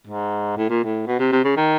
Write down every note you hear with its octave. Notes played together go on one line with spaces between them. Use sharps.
G#2
A2
A#2
A2
B2
C3
C3
C#3
D#3